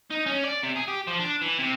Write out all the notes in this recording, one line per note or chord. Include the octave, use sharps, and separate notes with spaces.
D#4
C#4
D5
C3
G#4
G4
F3
D4
E3
C3